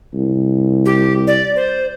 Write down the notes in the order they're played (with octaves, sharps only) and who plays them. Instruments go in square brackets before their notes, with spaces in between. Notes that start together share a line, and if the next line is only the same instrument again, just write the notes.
[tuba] C2
[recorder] G4
D5
C5